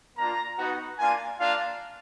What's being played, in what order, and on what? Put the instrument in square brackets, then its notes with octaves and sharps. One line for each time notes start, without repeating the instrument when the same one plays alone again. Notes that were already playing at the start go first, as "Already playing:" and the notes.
[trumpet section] A#3 D4 F4 A#5
B3 D#4 F#4
A#3 D4 F4 G#5
A#3 D4 F4 F5